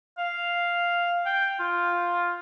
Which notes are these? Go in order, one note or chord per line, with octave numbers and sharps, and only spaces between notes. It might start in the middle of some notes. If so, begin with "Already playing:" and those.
F5
G5
F4